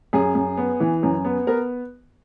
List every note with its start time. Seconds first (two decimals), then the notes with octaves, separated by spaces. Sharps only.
0.13 F#2 G#4
0.35 F#2
0.57 B3
0.80 E3
1.03 F#2
1.25 B3
1.47 B3 A#4